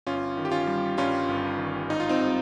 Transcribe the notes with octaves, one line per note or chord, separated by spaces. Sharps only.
G1 C#4 F4
D#3
G4
C#4 F4
G3
G2 C#4 F4
G1
D#3
G#1 D#4
F4
C4 D#4
G3